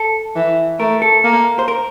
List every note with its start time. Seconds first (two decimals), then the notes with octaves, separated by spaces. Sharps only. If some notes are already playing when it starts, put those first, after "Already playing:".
Already playing: A4
0.36 E3
0.80 A3 A#4
1.02 A4
1.24 A#3
1.59 C5
1.68 A#4